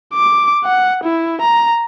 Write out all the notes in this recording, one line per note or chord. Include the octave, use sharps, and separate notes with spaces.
D6
F#5
E4
A#5